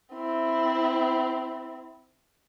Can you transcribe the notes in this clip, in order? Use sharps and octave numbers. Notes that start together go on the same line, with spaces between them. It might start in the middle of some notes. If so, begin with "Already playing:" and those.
C4 E4